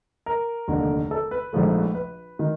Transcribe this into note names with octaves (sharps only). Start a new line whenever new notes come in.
A#4
F1 D#2 D3
A4
B4
A#1 G#2 F3 A3
B4
D#3